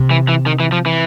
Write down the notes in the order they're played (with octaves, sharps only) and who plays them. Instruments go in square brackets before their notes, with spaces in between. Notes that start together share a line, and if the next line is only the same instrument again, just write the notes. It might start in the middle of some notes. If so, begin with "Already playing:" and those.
Already playing: [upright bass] C3
[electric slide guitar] E3
E3
D#3
E3
F3
E3